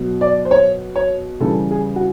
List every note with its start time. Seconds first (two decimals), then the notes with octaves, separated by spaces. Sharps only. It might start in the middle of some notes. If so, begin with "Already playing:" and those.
Already playing: B2 F#3
0.21 D5
0.45 C5
0.51 C#5
0.96 C#5
1.40 C#3 E3 G3 A4
1.71 G#4
1.96 F#4